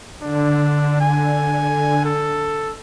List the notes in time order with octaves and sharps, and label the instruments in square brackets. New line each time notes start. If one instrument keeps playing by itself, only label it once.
[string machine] D3 [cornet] D4
[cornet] G#5
A4